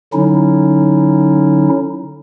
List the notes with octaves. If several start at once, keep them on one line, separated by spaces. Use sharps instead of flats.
D3 F#3 C#4 D#4 E4